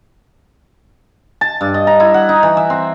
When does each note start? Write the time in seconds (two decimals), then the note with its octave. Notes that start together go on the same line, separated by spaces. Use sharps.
1.41 A5
1.61 G2
1.74 D#5
1.87 A#5
2.00 E4
2.14 F#5
2.29 D#4
2.43 E3
2.57 E5
2.70 C4